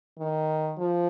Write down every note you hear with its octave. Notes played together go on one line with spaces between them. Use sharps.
D#3
F3